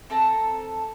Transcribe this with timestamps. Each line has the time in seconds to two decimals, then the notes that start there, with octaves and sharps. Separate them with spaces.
0.10 C4 A4 A5 A#5